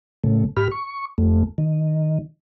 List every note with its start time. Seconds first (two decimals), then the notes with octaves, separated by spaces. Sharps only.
0.24 A2 C#3 A3
0.57 G#2 G4 B5 F6
0.71 C#6
1.18 F2 A3
1.58 D#3